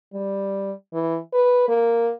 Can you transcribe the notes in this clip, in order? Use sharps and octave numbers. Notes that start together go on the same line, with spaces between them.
G3
E3
B4
A#3